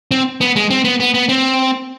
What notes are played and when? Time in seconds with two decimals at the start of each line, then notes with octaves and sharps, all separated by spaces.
0.11 C4
0.41 B3
0.56 G#3
0.70 C4
0.84 B3
1.00 B3
1.14 B3
1.29 C4